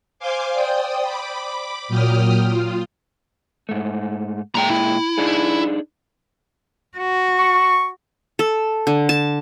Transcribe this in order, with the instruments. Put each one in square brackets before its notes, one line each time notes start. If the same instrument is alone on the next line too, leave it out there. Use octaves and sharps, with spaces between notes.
[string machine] C5 F5 G#5 C6 D6
C5 D5 G5 D#6
B5 D6
A#2 F#3 G5 D#6 F6
F4
[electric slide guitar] G#2 A3
[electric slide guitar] A#2 G#3 G5 [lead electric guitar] G#4 A#5
[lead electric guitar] E4
[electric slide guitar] D4 D#4 G#4
[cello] F#4
[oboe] C#6
[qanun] A4
D3
A5